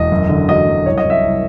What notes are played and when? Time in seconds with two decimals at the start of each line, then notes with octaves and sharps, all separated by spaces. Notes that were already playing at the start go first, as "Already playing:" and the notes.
Already playing: E1 D#5
0.12 F#2
0.29 D3
0.49 F#3 D#5
0.67 F#2
0.86 C2 C#5
0.98 D#5
1.05 C2
1.10 E5
1.23 C2